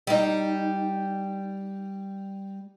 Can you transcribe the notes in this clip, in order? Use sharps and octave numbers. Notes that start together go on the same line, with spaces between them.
G3 D#4